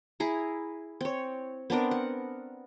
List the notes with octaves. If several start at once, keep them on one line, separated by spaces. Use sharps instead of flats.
E4 G#4 A#5
C4 C#5
B3 C4 D4 A#4
F#5